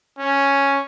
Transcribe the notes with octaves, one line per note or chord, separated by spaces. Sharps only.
C#4